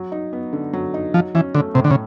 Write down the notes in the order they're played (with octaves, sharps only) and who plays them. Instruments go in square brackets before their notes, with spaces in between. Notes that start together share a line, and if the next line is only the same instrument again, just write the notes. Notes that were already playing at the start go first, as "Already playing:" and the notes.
Already playing: [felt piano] F#3
D#4
B3
D3
F#3
D#4
[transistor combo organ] F3 [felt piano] F#3
[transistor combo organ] E3 [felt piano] C#4
[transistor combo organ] D3 [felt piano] A3
[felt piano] A2 [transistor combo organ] C3
[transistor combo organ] D3
C#3